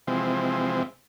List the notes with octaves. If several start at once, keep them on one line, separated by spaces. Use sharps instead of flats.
C3 E3 F3 G#3 C4